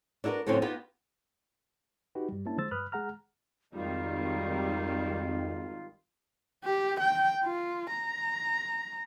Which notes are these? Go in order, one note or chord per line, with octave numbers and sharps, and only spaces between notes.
D4 E4 F#4 A#4 B4
A2 D3 F3 F#3 C4 C#4
B3 D#4 F4 G4 B4
D#4 F#4 G4 B4
G2 G3
A#3 C#4 D4 E4 A5
D3 F3 G#3 C5 E6 A6
G2 B4 B5 D#6 F6 F#6
G#3 G#4 F#5 A#5 F6
G#1 F2 D#3 G3 F4
G4
G5
F4
A#5